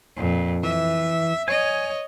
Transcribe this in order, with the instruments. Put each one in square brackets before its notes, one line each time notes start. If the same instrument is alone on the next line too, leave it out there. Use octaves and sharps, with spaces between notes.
[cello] F2 A#2
[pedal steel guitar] E3 [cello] E5
[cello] C#5 D#5 [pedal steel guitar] G#5